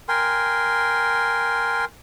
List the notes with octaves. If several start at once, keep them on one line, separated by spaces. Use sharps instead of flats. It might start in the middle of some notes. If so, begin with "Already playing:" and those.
A#4 G5 G#5 C6